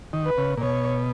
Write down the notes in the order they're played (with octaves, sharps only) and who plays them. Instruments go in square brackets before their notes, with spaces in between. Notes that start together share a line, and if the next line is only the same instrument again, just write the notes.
[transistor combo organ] D#3
[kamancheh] B4
[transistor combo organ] C#3
A#2
[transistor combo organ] B2 [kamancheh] C#5